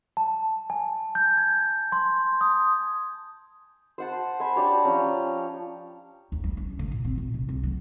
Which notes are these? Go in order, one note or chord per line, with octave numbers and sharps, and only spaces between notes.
A5
G#5
G6
G#6
C6
D#6
C5 F#5 A5
C5 G#5 B5
D4 G4 C#5
F3 C#4 G5 A#5
D#2
G3
C#4
D3
A#2
C4
A#2
C3
C2
F#3